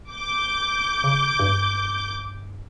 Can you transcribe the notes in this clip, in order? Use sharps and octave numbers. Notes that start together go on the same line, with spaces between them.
D6 G6
C#3
G2